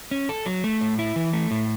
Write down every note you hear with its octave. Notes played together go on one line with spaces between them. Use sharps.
C#4
A4
F#3
A3
A2
E4
E3
A3
A2